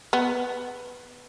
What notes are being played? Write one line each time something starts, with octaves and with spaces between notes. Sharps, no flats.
B3